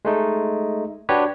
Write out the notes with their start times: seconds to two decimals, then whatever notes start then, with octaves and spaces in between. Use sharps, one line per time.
0.05 G#3 A3 D#4
1.09 D4 F#4 G4 B4 C#5